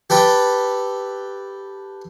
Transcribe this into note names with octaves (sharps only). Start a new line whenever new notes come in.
G4 A4 B4 G5